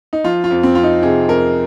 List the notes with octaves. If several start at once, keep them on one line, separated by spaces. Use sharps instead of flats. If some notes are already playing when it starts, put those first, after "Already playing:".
D#4
F3 F4
F4
F2
C4
F2 F4
D#4
C3 G#4
F2 A#4